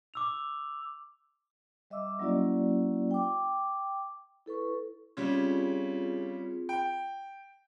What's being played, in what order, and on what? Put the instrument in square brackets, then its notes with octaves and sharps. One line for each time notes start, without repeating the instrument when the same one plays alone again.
[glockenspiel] D6 E6 F7
[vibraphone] G3 D#5 E5 D6 E6
F#3 A#3 C#4 E4 F#4 D5
G5 D6
E4 A4 B4 C#6
[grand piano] C#3 G3 [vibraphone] C4 F4 G#4
[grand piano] G5